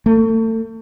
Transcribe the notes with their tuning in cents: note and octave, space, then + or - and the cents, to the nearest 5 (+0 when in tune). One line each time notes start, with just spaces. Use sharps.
A3 +35